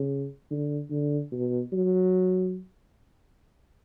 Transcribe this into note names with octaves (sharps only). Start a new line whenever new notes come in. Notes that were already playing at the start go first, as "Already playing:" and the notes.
Already playing: C#3
D3
D3
B2
F#3